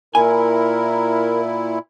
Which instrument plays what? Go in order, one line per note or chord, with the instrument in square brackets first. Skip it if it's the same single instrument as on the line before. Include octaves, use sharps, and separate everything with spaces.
[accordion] A#2 E4 [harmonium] A#4 [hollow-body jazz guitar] G#5